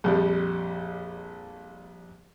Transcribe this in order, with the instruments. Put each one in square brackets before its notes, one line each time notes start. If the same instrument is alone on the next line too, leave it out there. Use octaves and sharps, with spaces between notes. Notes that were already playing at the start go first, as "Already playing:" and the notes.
[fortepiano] A#1 F2 G3